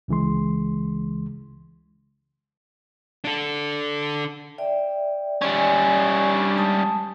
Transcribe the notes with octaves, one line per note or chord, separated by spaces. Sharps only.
C#2 C#3 E3 G#3 C6
D4 A4
D5 E5 G5
G3 C#4 D5 G#5
D4
G#3 A5 D#6